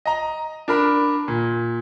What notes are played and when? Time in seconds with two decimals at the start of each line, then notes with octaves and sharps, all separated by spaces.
0.05 D#5 A#5
0.68 D4 A#4 B5
1.28 A#2